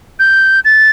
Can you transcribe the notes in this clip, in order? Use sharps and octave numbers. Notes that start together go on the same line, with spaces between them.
G6
A6